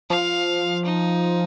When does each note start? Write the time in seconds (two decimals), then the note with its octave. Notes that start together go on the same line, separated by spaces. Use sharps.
0.10 F3 F5
0.85 D#4